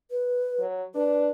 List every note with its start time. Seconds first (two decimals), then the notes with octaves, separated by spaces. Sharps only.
0.11 B4
0.59 F#3
0.95 D4 B4